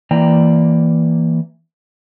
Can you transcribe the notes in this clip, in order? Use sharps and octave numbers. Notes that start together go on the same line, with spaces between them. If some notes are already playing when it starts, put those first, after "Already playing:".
E3 A#3 D5 G5 A#5